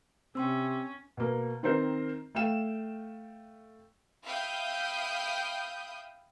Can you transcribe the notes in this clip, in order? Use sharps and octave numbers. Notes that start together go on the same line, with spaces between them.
C3 C4 C#4 G5 C6 E6
B2 A#3
D#3 C4 A#4 C5
A3 F5 G5 E7
E5 F5 G5 B5 D#6 G6